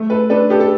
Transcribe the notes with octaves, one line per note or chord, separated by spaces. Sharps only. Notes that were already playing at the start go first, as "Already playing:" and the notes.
Already playing: A3
A4 B4
D4 A4 B4
G4 A4
A4